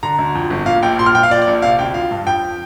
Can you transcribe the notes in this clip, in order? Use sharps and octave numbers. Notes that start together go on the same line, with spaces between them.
D3 A#5
D2
F2
G1
A#2 F5
A#1 G5
A#2 C6
F6
A#1 G5
F5
A#2 D5
D5
A#1
C3 F5
D2 G5
F3 F5
G2
F2 G5